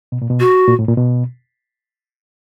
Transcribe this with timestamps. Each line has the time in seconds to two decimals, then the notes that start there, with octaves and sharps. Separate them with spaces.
0.12 B2
0.22 A#2
0.30 B2
0.40 F#4
0.68 A#2
0.79 A2
0.88 A#2
0.97 B2